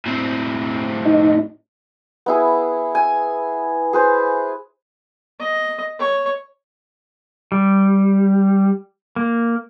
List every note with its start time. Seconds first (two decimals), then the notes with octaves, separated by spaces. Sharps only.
0.06 A2 C4
1.05 D#4
2.26 B3 E4 G#4
2.95 G#5
3.93 G#4 B4 C5
5.40 D#5
5.99 C#5
7.52 G3
9.16 A#3